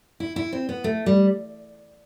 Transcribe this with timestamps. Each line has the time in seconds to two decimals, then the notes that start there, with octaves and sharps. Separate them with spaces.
0.20 E4
0.36 E4
0.52 C4
0.69 B3
0.84 A3
1.06 G3